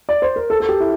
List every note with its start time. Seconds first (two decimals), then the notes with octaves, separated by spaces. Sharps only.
0.09 D5
0.22 C5
0.36 A#4
0.50 A4
0.60 A4
0.69 G4
0.80 E4